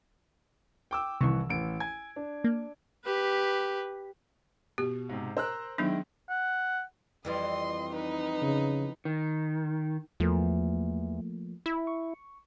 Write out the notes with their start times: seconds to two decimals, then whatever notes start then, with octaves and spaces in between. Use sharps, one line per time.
0.91 G5 D6 E6
1.21 C2 C3 D#3 E3 C#6
1.49 A1 D7
1.80 G#5 G#6
2.16 D4
2.44 A#3
3.05 G4 B4
4.78 B2 G4
5.09 G#2 C3
5.37 A#4 C5 A#5 E6 F#6
5.78 D#3 F#3 G#3 B3 D4 E4
6.29 F#5
7.25 F2 E3 G3 D#5 C6
7.93 D#4 B4
8.42 C#3
9.05 D#3
10.20 E2 F3 A3 A#3
11.66 E4
11.87 C#6